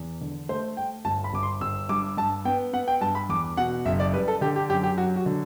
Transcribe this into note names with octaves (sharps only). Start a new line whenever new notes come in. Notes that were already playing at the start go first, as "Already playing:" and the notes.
Already playing: E2
D3
A3 C5
A3 G5
G1 A5
B5
G1 D6
C6
G1 E6
G2 D6
G2 A5
B3 G5
B3 F#5
G5
G2 A5
B5
E2 D6
B2 F#5
F#1 E5
D5
G3 B4
A4
D3 G4
G4
F#2 G4
G4
F#3 F#4
F#4
D3